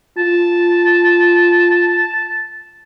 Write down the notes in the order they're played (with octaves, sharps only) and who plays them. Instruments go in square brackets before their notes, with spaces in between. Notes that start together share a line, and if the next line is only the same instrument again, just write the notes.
[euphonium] F4 [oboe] A5